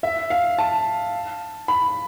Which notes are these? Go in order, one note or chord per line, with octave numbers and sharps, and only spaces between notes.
E5
F5
A5
B5